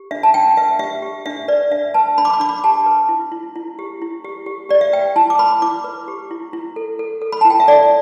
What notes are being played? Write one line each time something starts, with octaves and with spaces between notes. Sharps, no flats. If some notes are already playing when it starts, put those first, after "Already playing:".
Already playing: G4
D4 E5
A5
D4 G5
B4 E5
G4 E5
G4
D4 E5
B4 D5
D4 E5
B4 A5
D4 B5
D6
B5
D4 D6
B5
G4 A5
B4
E4
E4
E4
G4
E4
G4
G4
G4 D5
E5
B4 G5
E4 A5
D6
B4 B5
E4 D6
B4
G4
E4
E4
A4
A4
A4
B5
E4 A5
G5
E5
A4 D5